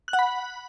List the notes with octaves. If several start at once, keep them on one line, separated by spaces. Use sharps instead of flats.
F#6
F#5
B5